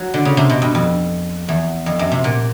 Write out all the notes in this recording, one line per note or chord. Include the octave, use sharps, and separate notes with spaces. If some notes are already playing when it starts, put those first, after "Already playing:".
Already playing: F#3
D3
C#3
C3
B2
G2
F2
E2
F2
F#2
C3
A#2